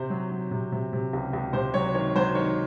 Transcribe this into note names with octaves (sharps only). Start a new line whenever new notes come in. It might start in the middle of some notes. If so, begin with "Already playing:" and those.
Already playing: C3 C5
F#3
F#3
C3
C3
C3
C#2
C#2
C3 C5
F#3 C#5
D#3 C#5
F#3 C5
D#3 C#5